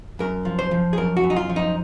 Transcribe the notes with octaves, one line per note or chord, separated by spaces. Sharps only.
F#2 A#4
F3
C5
F3
G#4
F#2 A#4
F#4
F#2
D#4
F4
F3
D#4